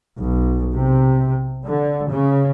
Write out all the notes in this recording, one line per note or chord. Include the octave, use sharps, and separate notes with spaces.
B1
C3
D3
C#3